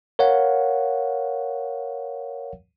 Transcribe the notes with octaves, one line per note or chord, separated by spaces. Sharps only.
A#4 C#5 F5 F#5